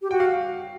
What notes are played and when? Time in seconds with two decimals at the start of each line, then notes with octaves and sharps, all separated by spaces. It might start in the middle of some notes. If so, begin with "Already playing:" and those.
0.02 G4
0.11 F#4 G5
0.20 F5